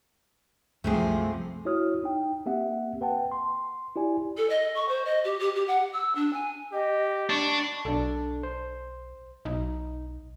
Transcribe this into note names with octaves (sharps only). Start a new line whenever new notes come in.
C2 F#2 C3 F3 A3 C4 G#4
E4 F#4 C#5 D#6 F6
D#4 G5
A#3 C4 G4 E5 F#5
B4 F#5 G5 A5
C6
E4 G4 D5 G#5
A4
D#5
C#6
C5
D#5
G4
G4
G4
F#5
E6
D4
G#5
G4 D#5
D4 B5 C#6
B1 D4 A4
C5
B1 D#4